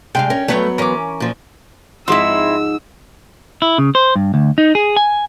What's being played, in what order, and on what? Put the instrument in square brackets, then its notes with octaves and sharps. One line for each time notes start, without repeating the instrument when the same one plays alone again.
[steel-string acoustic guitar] C3 [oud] G#3 D4 F5 [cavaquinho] G5
[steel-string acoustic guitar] C#4 [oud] A#4
[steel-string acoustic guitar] F#3 B3 [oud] A3 B4 C#5
[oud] E3 C#4 [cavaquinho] A#4 D6
[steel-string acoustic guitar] A#2 F3
[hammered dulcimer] G#2 [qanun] F3 G#3 [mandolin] C4 E4 [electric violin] E6
[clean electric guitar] E4
C#3
C5
G2
D2
D#4
G#4
G#5